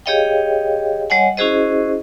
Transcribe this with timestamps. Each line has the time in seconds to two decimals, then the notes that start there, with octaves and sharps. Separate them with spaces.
0.06 G4 G#4 C#5 D#5 F5 G5
1.10 G3 C#5 D#5 F#5 G#5
1.37 C#4 E4 F#4 G#4 C5 D#5